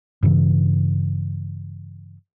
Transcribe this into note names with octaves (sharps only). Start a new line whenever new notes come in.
G2 C#3 E3